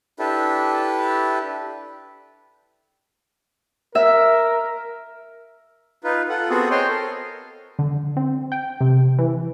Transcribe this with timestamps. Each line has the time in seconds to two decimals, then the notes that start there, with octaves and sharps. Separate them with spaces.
0.19 D4 E4 G4 A4 B4
3.95 A#4 E5
6.04 D#4 F4 B4
6.29 F4 A4 F#5
6.50 B3 C4 F#4 G#4 A4
6.71 C5 C#5 D#5 G5 C6
6.89 A4 A#4
7.79 D3
8.17 C4
8.52 G5
8.81 C3
9.19 E3